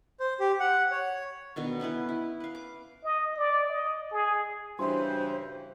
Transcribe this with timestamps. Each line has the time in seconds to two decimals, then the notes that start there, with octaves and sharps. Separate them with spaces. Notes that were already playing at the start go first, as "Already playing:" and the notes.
0.20 C5
0.40 G4
0.60 F#5
0.91 C#5
1.56 B2 D3 D#3
1.80 B3 C#4 E4 B4
2.09 E4
2.40 B4 F5
2.55 D6
3.04 D#5
3.37 D5
3.70 D#5
4.12 G#4
4.79 G2 C#3 E3 F#4 C5 G5